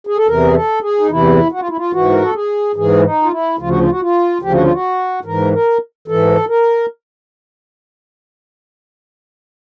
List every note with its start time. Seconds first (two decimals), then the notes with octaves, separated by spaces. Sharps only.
0.07 G#4
0.17 A4
0.27 E2 C3 E3 A#4
0.45 G#4
0.54 A4
0.82 G#4
1.00 D#4
1.10 E2 C3 E3 E4
1.52 F#4
1.60 F4
1.68 E4
1.77 F4
1.93 G#2 E3 F#4
2.11 A#4
2.22 A4
2.34 G#4
2.76 G#2 E3 G#4
2.99 E4
3.03 D#4
3.23 F4
3.31 E4
3.59 D2 C#3 F3 F4
3.69 F#4
3.80 F4
3.90 F#4
4.01 F4
4.42 D2 C#3 F3 G4
4.52 F#4
4.63 F4
4.73 F#4
5.25 G#2 E3 A#4
5.53 A#4
6.08 G#2 E3 A4
6.49 A#4